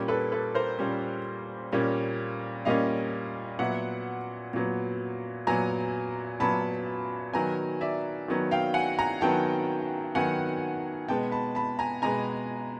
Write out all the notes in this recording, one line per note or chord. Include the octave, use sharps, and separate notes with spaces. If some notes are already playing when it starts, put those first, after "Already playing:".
Already playing: A#2 G3 A#3 C#4
A4 B4
A4 B4
A#4 C5
A#2 G3 A#3 C#4
A#2 G3 A#3 C#4
A#2 G3 A#3 C#4 D#5 F5
A#2 F#3 B3 E5 F#5
A#2 F#3 B3
A#2 F#3 B3 G#5 A#5
A#2 F#3 B3 A5 B5
D#3 F#3 B3 G#5 A#5
D5 E5
D#3 F#3 B3
F5 G5
F#5 G#5
G#5 A#5
D#3 F#3 B3 G5 A5
D#3 F#3 B3 F#5 G#5
B2 G#3 B3 G5 A5
A5 B5
A5 B5
G#5 A#5
B2 G#3 B3 G#5 A#5